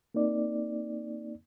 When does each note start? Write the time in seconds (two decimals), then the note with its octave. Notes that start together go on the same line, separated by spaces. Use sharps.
0.14 A#3 C4 D#4 D5